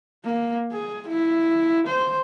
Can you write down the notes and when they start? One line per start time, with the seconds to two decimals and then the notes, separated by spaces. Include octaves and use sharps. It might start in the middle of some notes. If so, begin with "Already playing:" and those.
0.24 A#3
0.72 G#4
1.08 E4
1.86 C5